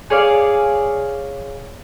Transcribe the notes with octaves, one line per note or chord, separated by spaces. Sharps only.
G#4 C#5 D5 F5